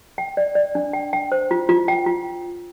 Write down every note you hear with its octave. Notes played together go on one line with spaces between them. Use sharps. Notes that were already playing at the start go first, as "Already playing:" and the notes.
G5
D5
D5
D4
G5
G5
C5
F4
F4
G5
F4